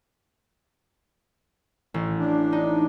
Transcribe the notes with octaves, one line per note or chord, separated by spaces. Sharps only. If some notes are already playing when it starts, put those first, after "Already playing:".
A1
D4
D#4